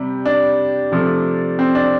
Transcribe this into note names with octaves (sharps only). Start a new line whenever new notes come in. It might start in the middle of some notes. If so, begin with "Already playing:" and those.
Already playing: C3 G3
D4
C3 F3 A3
C4
D4